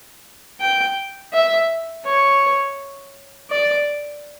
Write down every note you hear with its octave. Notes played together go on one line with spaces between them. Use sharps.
G5
E5
C#5
D5